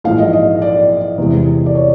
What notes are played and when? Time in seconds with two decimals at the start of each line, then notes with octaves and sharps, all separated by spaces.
0.04 A#1 G#2 E3 G#3 F5
0.18 D#5
0.33 D#5
0.62 D5
1.18 E2 C3 E3 G#3
1.66 D5
1.75 C#5